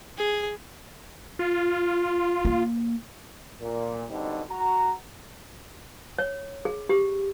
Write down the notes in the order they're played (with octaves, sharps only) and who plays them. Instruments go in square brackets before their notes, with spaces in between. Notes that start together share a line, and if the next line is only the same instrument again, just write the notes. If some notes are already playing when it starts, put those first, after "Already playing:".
[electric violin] G#4
[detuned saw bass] F4
[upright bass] A#3
[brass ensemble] A#2
B2 D3 G3 C4 D#4
F#4 A#5
[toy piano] C#5
G#4
G4